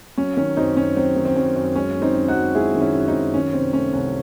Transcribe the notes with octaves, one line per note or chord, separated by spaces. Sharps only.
F#3 C#4
D#3 C#4
F#2 C4 D#4
F#2 C#4
F#3 C4
D#3
C4
F#2 C#4
F#2
G#3 C#4
D#3
C4 D#4
F#2
D#4 F#4
F#2
G#3 E4 G#4
D#3
C#4 E4
F#2
C4 D#4
F#2
D#3 C#4
C3 C4
A3 C#4
C2 C#4